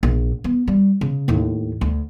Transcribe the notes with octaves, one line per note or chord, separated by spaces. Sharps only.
A#1
B3
G3
C#3
D#2 A2
D2